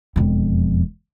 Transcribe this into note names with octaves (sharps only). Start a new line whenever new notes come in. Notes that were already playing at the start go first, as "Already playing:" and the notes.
E1 F2